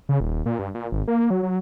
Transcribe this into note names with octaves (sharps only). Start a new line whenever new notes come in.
C#3
D#1
A#2
G2
A#2
G#1
A#3
F#3
F#3